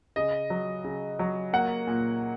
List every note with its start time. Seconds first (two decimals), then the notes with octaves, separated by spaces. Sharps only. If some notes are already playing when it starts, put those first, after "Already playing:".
0.16 C#3 D#5
0.50 F#3
0.84 C#3
1.19 F#3
1.53 A#3 F#5
1.87 A#2